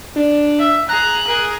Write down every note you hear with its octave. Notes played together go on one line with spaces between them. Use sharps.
D4
E5
G#4 A#5 F#6
G#4 A#4